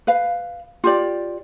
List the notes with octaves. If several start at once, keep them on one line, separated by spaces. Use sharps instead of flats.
B4 F5
F4 G4 D5